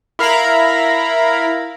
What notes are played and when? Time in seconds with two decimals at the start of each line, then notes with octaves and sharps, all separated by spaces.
0.19 E4 A#4 F5 A#5 B5